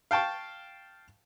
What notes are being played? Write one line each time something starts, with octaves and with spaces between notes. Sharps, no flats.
F5 G5 A5 C#6